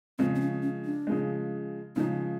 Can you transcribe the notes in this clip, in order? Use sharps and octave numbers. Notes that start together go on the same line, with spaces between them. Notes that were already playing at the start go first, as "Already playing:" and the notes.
C#3 F3 G#3 C4
C4
C#4
C#4
D4
C#3 F3 G#3
C#3 F3 G#3 D#4